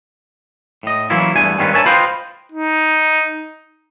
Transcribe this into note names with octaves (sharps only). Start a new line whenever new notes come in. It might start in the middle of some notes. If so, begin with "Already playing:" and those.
A2 D#5
E3 F#3 A#3 C#4 E4 F4
E2 G2 A3 B3 G#5
G2 D#3 C4 C#4 F4 B4
A#4 C#5 E5 G#5 A5
F4 B4 C5 D#5 F5 G5
D#4